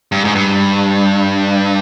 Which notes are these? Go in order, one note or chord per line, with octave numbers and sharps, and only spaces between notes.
G2
G#2
G2